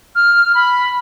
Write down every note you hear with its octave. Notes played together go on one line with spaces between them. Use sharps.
F6
B5